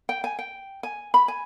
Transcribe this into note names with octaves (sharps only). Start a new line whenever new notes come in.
G5
G#5
G5
G#5
B5
G#5